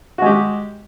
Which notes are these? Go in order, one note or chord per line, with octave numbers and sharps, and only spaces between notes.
G#3 F#4 G4